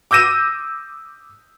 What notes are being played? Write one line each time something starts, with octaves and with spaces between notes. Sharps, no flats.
D6 E6 G6 A#6 D#7 E7